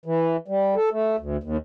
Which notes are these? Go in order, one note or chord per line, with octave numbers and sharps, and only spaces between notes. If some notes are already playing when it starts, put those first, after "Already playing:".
E3
G3
A4
A3
D2
D#2